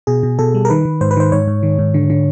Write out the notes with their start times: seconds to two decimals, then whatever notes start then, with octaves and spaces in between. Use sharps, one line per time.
0.07 B2 G#4
0.23 B2
0.39 B2 A4
0.54 G3
0.65 A#4
0.70 D#3 B4
0.85 D#3
1.01 G#2 C5
1.11 B4
1.16 D#3 C5
1.32 G#2 C#5
1.47 G#2
1.63 D#3
1.79 G#2
1.94 D3
2.10 D3